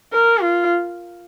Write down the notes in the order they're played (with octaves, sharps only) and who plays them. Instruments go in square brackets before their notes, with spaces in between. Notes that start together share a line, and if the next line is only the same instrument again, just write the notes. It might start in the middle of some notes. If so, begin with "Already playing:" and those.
[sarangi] A#4
F4